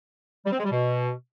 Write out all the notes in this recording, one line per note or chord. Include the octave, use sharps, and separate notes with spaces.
G3
C4
G#3
G3
B2